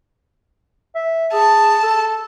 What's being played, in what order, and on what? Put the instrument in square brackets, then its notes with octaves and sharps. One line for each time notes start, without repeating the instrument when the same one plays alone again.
[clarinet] E5
[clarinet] G#4 [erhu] A5
[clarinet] A4